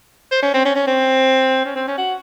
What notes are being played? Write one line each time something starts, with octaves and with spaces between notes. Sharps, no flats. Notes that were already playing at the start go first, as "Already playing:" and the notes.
C5
C#4
C4
C#4
C#4
C4
C#4
C4
C#4
F#4